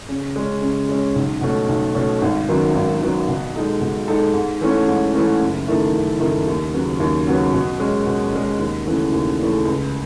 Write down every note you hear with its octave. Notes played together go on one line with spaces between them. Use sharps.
C#3
G#3 C#4
C#3
G#3 C#4
B1
B2 A3 C#4
B1
B2 A3 C#4
G#1
F#2 D#3 F#3 B3
G#1
F#2 D#3 F#3 B3
B2
G#3 D#4 A4
B2
G#3 D#4 A4
G#2
E3 A3 C#4
G#2
E3 A3 C#4
F#1
F#2 D#3 A3 E4
F#1
F#2 D#3 A3 E4
D#2
C#3 F#3 B3
D#2
C#3 F#3 B3
B2
G#3 C#4
B2
G#3 C#4
D#2
C#3 E3 A3
D#2
C#3 E3 A3
C#2